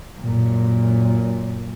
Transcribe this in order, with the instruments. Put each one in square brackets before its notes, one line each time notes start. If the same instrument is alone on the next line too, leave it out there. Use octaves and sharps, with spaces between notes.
[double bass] F#2 A#2